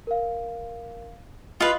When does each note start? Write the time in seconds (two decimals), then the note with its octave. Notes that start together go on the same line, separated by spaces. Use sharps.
0.07 A#4 F5
1.60 F4 B4 D#5 D#6 F6